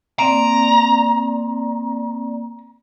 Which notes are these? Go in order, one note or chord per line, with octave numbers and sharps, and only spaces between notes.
A#3 C4 D5 A#5